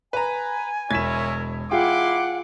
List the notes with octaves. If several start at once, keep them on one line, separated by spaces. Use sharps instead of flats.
B4 G#5 A#5
E1 E4 A#4 C#5 G#6 B6 E7
E4 F4 G#4 F#5 G5 C6 D6